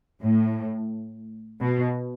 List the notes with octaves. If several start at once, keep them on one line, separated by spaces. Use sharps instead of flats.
A2
B2